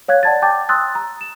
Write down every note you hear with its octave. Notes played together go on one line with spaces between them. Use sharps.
C#5 F5 F#6 G#6
D5 F#5 A5 G#6 A6
G5 A5 D6 G6 A6
C6 D#6 E6 F#6 A6
A#5
E7